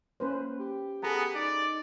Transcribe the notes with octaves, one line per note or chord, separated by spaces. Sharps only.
A#3 C#4 B4 C5
G4
B3 G#4 A4 A#5
D#4 D5